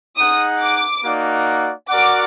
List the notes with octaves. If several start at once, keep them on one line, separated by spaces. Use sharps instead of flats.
D#4 G#4 D#5 F#5 D#6
D6
A#3 D#4 F#4 D5 F#5
F#4 A#4 D5 F#5 D6